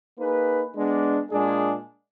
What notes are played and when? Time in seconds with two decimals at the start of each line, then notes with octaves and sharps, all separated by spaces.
0.18 A#3 D#4 G#4 B4
0.74 G#3 B3 D4
1.31 A#2 G#3 D4 G#4